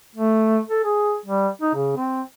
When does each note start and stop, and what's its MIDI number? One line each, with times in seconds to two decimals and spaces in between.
0.16 0.59 57
0.69 0.84 69
0.84 1.17 68
1.26 1.48 55
1.62 1.73 63
1.75 1.96 49
1.97 2.22 60